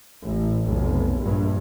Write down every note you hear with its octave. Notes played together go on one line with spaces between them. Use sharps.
A1
F1 B1
A#1 G2